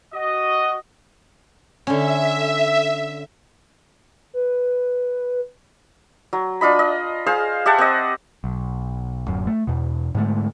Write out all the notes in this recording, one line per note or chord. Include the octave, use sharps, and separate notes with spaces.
F#4 D#5
D3 C#4 E5
B4
F#3
D4 F4 D#5 B5
D#5
G#4 C5 F5
G4 E5 F#5 A5
C4 D#5
B1
D1 F#2
A3
E2 B2
G#2 D3 G#3 A3